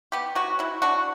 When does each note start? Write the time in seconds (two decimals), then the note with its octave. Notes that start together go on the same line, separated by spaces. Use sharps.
0.12 B3 G4
0.35 F#3 F#4
0.59 F#3 E4
0.82 D4 F#4